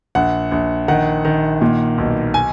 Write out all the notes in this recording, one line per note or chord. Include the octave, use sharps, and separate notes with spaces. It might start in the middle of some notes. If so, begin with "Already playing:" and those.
A#1 F#5
A#1
D#3 F#5
D#3
A#2
B1
G#5